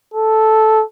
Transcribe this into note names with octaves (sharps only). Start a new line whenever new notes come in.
A4